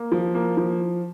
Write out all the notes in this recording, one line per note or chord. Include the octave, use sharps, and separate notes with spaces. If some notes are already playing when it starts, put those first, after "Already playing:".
Already playing: A#3
F3
A#3
F3